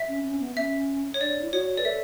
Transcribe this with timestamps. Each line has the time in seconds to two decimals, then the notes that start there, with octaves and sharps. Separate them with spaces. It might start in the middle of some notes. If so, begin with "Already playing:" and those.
Already playing: E5
0.08 C#4
0.24 C#4
0.40 B3
0.57 C#4 E5
1.14 C#5
1.21 D4 D5
1.42 E4
1.53 F#4 C#5
1.78 B4 D5
1.85 A4 E5